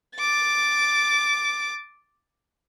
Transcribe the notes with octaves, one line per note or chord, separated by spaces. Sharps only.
D6 A6